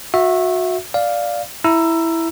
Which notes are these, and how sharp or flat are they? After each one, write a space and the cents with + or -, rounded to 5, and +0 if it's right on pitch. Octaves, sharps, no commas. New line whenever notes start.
F#4 -25 E5 +0
D5 +0 F5 +0
E4 +0 A#5 +0 E6 +20